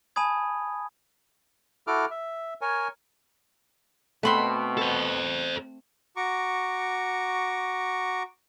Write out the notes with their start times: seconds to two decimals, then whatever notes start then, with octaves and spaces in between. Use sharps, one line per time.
0.16 G#5 A5 B5 D#6 G#6
1.87 E4 F#4 A4 D6 F6
2.11 E5
2.61 A#4 C#5 G#5
4.23 B2 A3 C4 F#5 B5 C6
4.78 A4 C5
6.16 F#4 A#5 C#6 D6